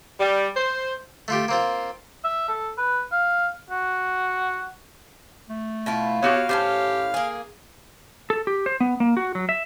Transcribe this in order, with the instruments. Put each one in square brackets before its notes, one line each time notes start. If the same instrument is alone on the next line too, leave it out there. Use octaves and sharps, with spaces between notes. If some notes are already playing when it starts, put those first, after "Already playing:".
[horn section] G3
C5
[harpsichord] A3 F4 G4
A#3 C4 F4
[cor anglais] E5
A4
B4
F5
F#4
[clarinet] A3
[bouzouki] B2 E4 F4
[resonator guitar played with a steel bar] B3 F#4 G4 [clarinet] C#5 [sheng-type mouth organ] F5
[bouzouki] A2 B3 C#4 [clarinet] G4 [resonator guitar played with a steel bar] C5
[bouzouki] A#3 G#4
[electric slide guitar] A4
G4
C5
B3
A#3
F#4
F#3
E5